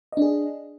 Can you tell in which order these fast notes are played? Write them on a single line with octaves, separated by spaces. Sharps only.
D#5 D4 G#4